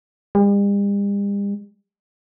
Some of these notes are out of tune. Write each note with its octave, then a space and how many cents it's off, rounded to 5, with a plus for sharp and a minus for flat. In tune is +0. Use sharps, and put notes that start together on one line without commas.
G3 +45